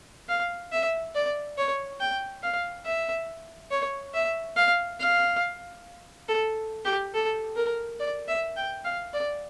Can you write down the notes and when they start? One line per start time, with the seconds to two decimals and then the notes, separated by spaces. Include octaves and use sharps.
0.29 F5
0.72 E5
1.15 D5
1.58 C#5
2.01 G5
2.43 F5
2.86 E5
3.71 C#5
4.14 E5
4.57 F5
5.00 F5
6.29 A4
6.85 G4
7.14 A4
7.56 A#4
8.00 D5
8.28 E5
8.57 G5
8.85 F5
9.14 D5